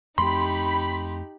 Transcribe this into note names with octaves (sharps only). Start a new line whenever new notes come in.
F2 A3 C4 D#4 G4 B5 C6